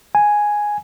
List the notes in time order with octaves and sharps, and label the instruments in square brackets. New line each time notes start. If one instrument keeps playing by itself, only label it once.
[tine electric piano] G#5